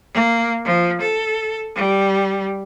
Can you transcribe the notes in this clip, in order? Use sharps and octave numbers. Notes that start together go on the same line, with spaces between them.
A#3
F3
A4
G3